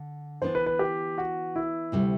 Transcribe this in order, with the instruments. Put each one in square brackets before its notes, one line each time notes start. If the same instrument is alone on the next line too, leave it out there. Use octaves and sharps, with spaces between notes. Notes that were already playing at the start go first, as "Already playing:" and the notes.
Already playing: [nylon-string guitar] D3
[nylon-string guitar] E3 B3 D4 [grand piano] C5
[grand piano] B4
B4
G4
F#4
E4
[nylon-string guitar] D2 C3 G3